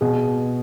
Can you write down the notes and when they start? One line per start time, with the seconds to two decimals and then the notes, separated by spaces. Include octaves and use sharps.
0.01 B2 G#4